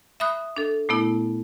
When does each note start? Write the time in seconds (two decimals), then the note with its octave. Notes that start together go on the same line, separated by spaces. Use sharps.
0.20 E5 B5 D#6 F#6
0.57 D4 A4
0.89 A#2 A3 B3 E4